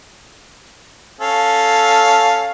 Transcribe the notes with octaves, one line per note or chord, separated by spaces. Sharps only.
C#4 A4 F5